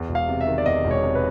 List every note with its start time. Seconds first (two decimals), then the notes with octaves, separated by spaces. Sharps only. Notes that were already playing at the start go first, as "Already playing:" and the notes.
Already playing: E2
0.09 E1
0.15 F5
0.28 C3
0.41 E5
0.46 D#3
0.58 D5
0.66 E2 D#5
0.84 E1
0.91 C#5
1.03 C3
1.15 B4